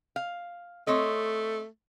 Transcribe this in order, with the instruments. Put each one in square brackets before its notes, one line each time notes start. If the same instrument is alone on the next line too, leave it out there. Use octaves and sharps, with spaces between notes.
[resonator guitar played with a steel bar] F5
[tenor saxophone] A3 [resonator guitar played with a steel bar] C4 C#5 D#5